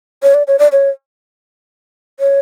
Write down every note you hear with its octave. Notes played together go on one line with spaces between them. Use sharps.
C#5
D5
C#5
D5
C#5
C#5